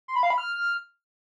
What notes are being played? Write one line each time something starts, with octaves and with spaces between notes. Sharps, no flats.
C6
B5
F5
B5
F6